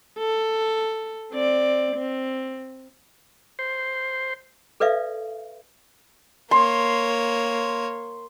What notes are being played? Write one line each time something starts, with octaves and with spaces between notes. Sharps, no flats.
A4
C4 D5
C4
C5
A4 B4 D5 E5 F5
A#3 C#5 C6